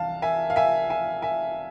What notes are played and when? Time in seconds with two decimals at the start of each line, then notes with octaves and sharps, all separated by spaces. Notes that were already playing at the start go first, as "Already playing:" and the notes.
Already playing: C2 E3 F5 A5
0.22 E5 G#5
0.50 F5
0.56 E5 G#5
0.90 E5 G#5
1.22 E5 G#5